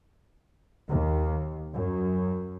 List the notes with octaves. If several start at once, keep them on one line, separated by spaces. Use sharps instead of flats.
D#2
F#2